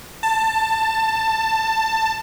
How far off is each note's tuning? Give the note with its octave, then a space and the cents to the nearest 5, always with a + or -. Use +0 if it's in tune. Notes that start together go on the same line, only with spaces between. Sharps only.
A5 +15